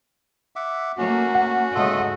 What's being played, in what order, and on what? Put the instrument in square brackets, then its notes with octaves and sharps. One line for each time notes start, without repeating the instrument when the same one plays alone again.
[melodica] E5 F#5 D6
[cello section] A3 A#3 [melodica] C#4 [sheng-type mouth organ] F#4
[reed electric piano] F#5
[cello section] G#2 C#3 D#5 [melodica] A3 F4 A4